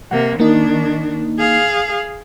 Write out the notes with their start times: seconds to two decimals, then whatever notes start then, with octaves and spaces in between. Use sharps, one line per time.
0.11 C3 A#3 F#5
0.40 D#3 A#3 D4 D#4
1.38 G#4 F5